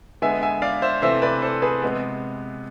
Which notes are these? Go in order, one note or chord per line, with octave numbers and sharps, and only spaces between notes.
D3 G#3 B3 E5 G#5
E5 G#5
D5 F5
C5 E5
C3 E3 A3 C4 C5 E5
B4 D5
A4 C5
G#4 B4
C3 G#3 B3